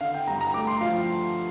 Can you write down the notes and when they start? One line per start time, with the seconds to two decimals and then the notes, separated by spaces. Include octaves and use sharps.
0.01 D3 F5
0.14 G5
0.27 G2 A#5
0.41 A#5
0.54 A3 D6
0.67 C6
0.80 F3 F5